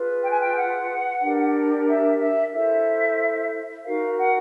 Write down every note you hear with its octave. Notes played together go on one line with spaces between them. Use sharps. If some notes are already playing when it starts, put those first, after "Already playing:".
Already playing: F4 G#4 B4
G5
G#5
G5
F#5
D4 G4 A#4
E5
E5
E4 A4 C5 E5
D#4 F#4 A#4 F5
F#5